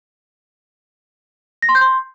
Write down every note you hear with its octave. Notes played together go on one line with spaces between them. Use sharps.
A#6
C6
G6
C6